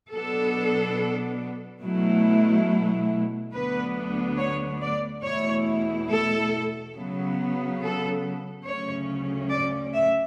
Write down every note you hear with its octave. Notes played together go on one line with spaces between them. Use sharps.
B2 F#3 B3 D4 A4
B2 F#3 A3 E4
D2 D3 F#3 B3 D4 B4
C#5
D5
E2 B2 A3 E4 C#5
A4
C#3 F#3 B3
A4
D2 C#3 F#3 A3 C#4 C#5
D5
E5